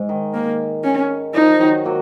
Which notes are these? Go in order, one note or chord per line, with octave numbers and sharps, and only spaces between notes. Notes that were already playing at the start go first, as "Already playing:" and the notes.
Already playing: G#2
D#3
A#3
C#4
F3 D#4
D#3 F#3
F#3 A#3